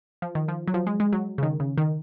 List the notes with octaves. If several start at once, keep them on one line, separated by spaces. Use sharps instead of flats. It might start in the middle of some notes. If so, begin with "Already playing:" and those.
F3
D#3
F3
F#3
F3
G#3
G#3
F#3
C#3
D#3
C#3
D#3